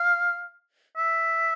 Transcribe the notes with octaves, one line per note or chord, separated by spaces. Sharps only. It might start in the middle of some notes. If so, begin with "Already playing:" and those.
Already playing: F5
E5